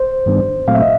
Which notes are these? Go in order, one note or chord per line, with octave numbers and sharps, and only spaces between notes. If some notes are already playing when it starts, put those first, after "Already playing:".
Already playing: C5
G2 D#3 G3 B3 D4
A#2 F#3 A3 C4 F5
E5
D#5